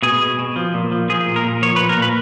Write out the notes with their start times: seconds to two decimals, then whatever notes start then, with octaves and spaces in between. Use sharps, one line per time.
0.02 B2 G#4
0.21 B2
0.39 B2
0.56 F3
0.74 A#2
0.92 F3
1.09 F3 G#4
1.26 A#2
1.36 A#4
1.45 A#2
1.62 F3 C#5
1.76 A#2 B4
1.89 A#4
1.98 A#2 B4